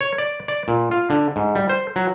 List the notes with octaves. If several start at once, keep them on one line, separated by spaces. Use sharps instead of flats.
C#5
D5
D5
A#2
F4
D3
G#2
G3
C5
F#3